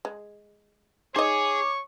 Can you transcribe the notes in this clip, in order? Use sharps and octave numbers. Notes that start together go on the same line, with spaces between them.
G#3
D#4 G#4 C#5 D#5 C#6 D6